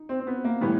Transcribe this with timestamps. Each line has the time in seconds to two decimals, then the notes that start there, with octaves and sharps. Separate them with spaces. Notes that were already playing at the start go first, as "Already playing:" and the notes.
Already playing: D#4
0.09 C4
0.20 C4
0.27 B3
0.44 A#3
0.61 A2 E3 G3 B3